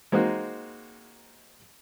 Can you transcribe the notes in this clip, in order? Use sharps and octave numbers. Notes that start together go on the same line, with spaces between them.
G#3 A#3 C4 D#4 F#4